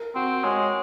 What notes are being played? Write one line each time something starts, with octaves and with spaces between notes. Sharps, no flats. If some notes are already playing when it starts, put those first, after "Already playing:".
Already playing: A#4
C4 F#4
G#3 C#5